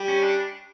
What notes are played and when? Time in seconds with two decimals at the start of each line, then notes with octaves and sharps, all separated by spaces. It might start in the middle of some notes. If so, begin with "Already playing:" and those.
Already playing: G3
0.08 C#4
0.23 D4